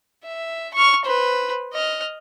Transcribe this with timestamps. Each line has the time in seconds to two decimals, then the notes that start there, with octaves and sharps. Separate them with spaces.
0.25 E5
0.74 C#6 F6
1.05 B4 C5
1.73 D#5 F6